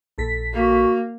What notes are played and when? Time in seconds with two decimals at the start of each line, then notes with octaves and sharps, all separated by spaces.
0.18 A#1 A4 B6
0.53 A#3 F#4